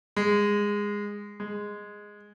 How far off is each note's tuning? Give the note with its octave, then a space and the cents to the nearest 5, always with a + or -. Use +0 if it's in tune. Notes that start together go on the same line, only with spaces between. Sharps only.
G#3 -15
G#3 -5